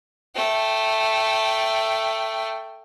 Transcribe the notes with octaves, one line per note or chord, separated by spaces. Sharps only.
A3 G5